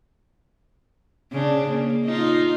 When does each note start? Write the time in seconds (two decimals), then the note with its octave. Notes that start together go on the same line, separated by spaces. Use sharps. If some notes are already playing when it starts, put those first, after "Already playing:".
1.32 C#3 D4
1.71 A#3
2.05 D#4 F4